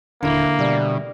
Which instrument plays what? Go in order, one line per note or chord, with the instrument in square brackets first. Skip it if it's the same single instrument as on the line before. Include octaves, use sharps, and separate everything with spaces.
[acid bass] D#1 [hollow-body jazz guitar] D3 E4 [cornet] A#3
[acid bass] B2 [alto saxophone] G3